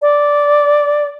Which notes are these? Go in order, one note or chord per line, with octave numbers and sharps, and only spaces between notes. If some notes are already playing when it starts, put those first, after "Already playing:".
D5